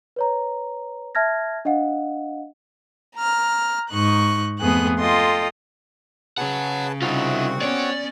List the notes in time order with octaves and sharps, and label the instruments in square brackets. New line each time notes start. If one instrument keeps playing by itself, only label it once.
[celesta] B4 C#5 A#5
E5 A5 F6 G#6 A#6
D4 D#5 F5 F#5
[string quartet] A#5 F6
G#2 D#4 C#6 F#6
F2 A3 B3 G#4 F#6
F4 A4 D#5 G5 C6
[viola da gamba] C#3 [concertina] G#4 B4 A5 [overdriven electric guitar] C#5 F#5
[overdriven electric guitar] C2 [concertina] C4 F#4 F#5 [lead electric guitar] D#4 F4
[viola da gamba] B3 C#4 [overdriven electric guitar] C#5 [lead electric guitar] D5